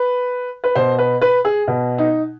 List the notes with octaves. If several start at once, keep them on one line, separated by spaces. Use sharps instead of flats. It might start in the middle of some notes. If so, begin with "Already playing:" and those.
Already playing: B4
B4
B2 C5
B4
B4
G#4
B2
D#4